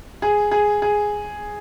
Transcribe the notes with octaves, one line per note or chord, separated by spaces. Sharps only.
G#4
G#4
G#4